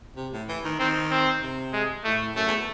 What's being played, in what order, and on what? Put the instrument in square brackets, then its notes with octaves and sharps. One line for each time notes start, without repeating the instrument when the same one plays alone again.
[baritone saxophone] C3
A2
E3
D#3
[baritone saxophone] D#3 [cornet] C4
[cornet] C4
[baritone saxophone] C3
[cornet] G#3
[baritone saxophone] A2 [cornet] A3
[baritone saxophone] F#2 [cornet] A3
[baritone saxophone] E2